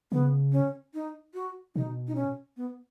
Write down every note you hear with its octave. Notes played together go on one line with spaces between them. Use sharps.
C#3 B3
C#4
D#4
F#4
B2 D#4
D#4
C#4
B3